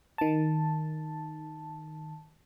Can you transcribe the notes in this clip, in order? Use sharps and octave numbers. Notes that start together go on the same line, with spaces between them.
D#3 A5